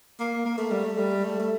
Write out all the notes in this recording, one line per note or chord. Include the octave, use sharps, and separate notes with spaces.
A#3
A#3
A3
G3
A3
G3
A3
A3